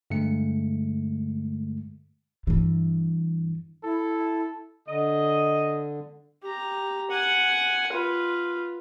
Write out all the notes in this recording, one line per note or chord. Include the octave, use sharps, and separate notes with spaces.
G2 D3 G#3 A3 C#7
G2 E3
E4 A4
D3 D#5
G4 A#5
F#5 G#5
F4 B4